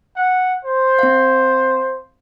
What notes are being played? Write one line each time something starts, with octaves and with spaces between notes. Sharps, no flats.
F#5
C5
C4 F5